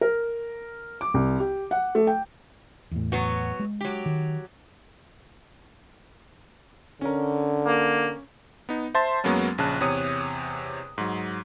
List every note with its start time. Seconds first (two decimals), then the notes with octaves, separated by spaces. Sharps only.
0.01 A#4
1.01 D6
1.14 C2
1.40 G4
1.71 F#5
1.95 A3
2.07 G5
2.91 E2 A2
3.12 F#3 B3 F#4
3.59 G#3
3.81 F#3 G4
4.06 D#3
7.01 D3 C#4 A#4
7.67 A#3
8.69 B3 D#4
8.95 C5 E5 A5 C6 A6
9.24 F#2 F#3 G#3 A#3 B3 C#4
9.58 A#1 C#3 A5 F#6
9.80 E2 C3 C#5 D#6 D#7
10.98 G#2 F#3